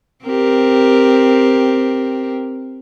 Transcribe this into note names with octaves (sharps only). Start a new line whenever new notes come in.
C4 G4 A#4